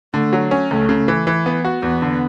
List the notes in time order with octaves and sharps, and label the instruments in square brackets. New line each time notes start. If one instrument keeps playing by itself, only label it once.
[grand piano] D3 [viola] A3
[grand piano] F#3
C#4
[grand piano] C#2 [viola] A3
[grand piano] C#3
E3
E3
B3
F#4
[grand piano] E2 [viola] B3
[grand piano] D3